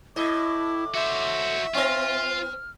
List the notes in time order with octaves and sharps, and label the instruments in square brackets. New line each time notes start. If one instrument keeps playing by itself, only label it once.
[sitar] A2 D#5 [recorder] E4 [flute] D6
[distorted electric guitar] F#4 C5 [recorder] E5
[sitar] B3 C4 [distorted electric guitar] F4 [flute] F6